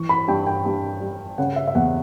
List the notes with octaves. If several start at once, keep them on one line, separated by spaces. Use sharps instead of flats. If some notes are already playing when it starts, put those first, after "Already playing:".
Already playing: E3 C#6
B5
G2 G5
G5
G2
G3
C#3 F#5
E5
E5
E2 F#5